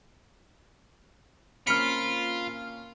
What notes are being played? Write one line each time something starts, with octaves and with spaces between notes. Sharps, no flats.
A#3 C4 C#4 F4 B5 F6 C#7